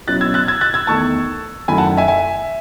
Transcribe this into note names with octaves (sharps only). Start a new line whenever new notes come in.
B2 F#3 C#4 E4 F#6 A6
E6 G#6
F#6 A6
E6 G#6
F#6 A6
E6 G#6
E2 D#3 A3 D#4 A5 C#6
F#2 D#3 A3 E4 G#5 B5
F#5 A5
E5 G#5
E5 G#5